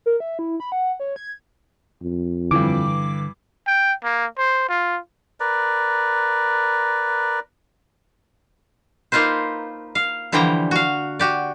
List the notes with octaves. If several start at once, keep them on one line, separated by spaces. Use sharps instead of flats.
A#4
E5
E4
B5
F#5
C#5
G#6
F2
G2 D3 E3 D6
G5
A#3
C5
F4
A#4 B4 D5
A#3 D#4 F4 B4 C5
F5
D3 E3 F3 G3 G5 A#5
F#4 F5
F#4 G4 D5